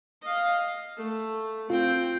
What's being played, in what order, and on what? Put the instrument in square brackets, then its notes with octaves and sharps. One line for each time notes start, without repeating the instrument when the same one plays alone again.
[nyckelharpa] D#5 F5
A3
[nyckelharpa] C4 G5 [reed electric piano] F4